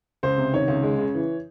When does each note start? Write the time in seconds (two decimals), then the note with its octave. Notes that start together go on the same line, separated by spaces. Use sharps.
0.23 C#2 C5
0.38 C3
0.53 D#3 C#5
0.68 C#2
0.83 G#3
0.98 C#3
1.14 E3